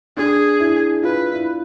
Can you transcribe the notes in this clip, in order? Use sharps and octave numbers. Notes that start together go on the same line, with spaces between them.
D4 G#4
E4
F4 B4
E4